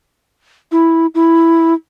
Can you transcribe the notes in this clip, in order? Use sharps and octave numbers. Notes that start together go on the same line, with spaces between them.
E4
E4